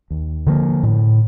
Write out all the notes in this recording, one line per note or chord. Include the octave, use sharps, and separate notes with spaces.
D#2
D3 F3 A#3
A2